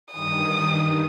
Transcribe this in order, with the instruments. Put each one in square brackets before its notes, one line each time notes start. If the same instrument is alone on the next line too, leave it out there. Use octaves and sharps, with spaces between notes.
[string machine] G2 D#3 [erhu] D#6